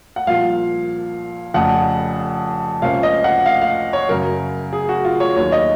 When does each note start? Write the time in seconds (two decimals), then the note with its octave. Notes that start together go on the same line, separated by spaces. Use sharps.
0.16 F#5
0.27 C2 A#2 F3 F5
1.54 F1 F2 C#3 F#5
2.82 C#2 C3 F3 A#3 C#4 F5
3.03 D#5
3.24 F#5
3.46 F5
3.62 F5
3.93 C#5
4.09 F#2 C#3 F#3 A#4
4.73 G#4
4.89 F#4
5.05 F4
5.20 C#5
5.36 D#2 D#3 F#3 C#5
5.52 D#5